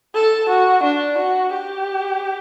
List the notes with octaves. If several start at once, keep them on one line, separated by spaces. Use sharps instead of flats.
A4
F#4
D4
F#4
G4